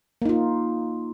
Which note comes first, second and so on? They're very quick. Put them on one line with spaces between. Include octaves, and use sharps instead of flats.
A#3 D#4 F4